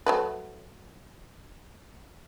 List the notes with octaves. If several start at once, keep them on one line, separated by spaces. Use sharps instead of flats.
F#3 A3 B4